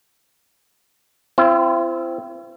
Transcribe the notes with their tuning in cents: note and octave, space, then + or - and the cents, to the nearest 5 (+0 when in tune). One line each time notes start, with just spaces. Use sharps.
C4 -5 E4 +45